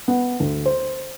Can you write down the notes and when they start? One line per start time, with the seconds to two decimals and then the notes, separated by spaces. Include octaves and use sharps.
0.08 B3
0.40 D2
0.66 C5